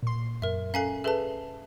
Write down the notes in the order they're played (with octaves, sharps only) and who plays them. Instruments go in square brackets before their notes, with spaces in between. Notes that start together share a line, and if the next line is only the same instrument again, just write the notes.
[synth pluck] A#2 C6
[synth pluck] F#2 [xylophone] A#4 E5
[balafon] C#4 A4 [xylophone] F5 G#5 C7
[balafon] G#4 A4 B4 [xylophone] E5 A5